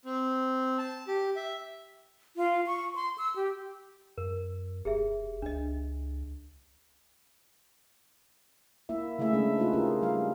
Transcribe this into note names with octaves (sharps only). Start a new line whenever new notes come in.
C4
A5
G4
E5
F4
C#6
C6
E6
G4
F#2 A#4
E1 G4 G#4 E5
C#2 D4 D#5
A#3 E4 E5
C#3 A3 E4 G#4 E5
G#3 C#4 D4
A#3 D#4 F4 G#4 B4
C#4 E4 F4 G4 G#4 A#4
G3 F5